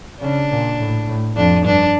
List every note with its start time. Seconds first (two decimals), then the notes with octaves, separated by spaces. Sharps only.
0.21 C#3 D4
0.51 A#2
0.79 A2
1.08 A2
1.36 F2 D4
1.65 G2 D4